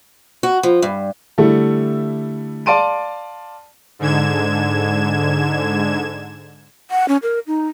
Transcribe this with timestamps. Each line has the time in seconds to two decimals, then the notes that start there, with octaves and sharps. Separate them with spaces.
0.43 F#4
0.63 F3
0.82 G2
1.38 D3 G3 A3 E4 A4
2.66 D5 F5 A5 C6 D7 D#7
3.99 G#2 D3 G#6 E7
6.91 F#5
7.08 C#4
7.23 A#4
7.47 D#4